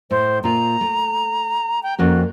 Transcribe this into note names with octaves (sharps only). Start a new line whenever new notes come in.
A2 C5
A#2 F4 A#5
A3
G5
F2 A#3 C#4 F#4